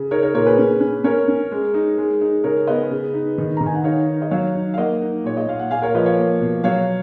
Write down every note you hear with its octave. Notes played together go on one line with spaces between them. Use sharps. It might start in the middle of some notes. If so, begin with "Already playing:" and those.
Already playing: C#3
D#4 A#4 C#5
A#4 C#5
A#2 A#4 C#5
G#4 B4
C#4
C#4
C#4 A#4 C#5
C#4
G#3
D#4
G#3
D#4
C#3 A#4 C#5
B3 B4 D#5
C#3
D#4
D#3
D#3 A#5
G#5
F#5
D#4 C#5 F5
D#4
D#5
F#3 C#5 F5
D#4
F5
A#3 D#5 F#5
D#4
A#2 C#5
D#5
A#2 F5
F#5
A#2 F5 G#5
A#4 C#5
F3 B4 D#5
C#5 F5
A#3
B2
F#3 C#5 F5